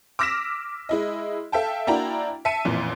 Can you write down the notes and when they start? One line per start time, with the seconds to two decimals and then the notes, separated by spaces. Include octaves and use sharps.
0.19 D6 E6 F6 A#6 B6 E7
0.89 G#3 E4 D#5
1.52 A4 E5 F5 G5 A5
1.87 A#3 D4 E4 F#4 G5 A#5
2.45 E5 A5 B6 C#7 D#7
2.65 A1 F2 A#2 E3